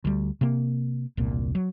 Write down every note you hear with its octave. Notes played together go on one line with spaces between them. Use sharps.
D2 G3
C3 A#3
E1 C2 A#2
F#3